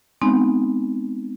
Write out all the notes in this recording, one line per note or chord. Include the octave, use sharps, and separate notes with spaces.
G#3 B3 C4 D#4